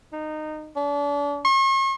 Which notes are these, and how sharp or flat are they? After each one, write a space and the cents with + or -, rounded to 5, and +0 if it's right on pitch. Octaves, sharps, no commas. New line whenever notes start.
D#4 -20
D4 -35
C#6 -45